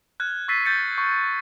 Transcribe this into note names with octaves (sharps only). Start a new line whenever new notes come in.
F6 F#6 G#6
C#6 E6 A6 B6 C7 D#7
G6 A6 B6 C#7
C#6